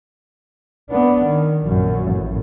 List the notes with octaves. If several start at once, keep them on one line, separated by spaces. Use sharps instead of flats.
B3 D4
D#3
A#1 F#2
A1 F#2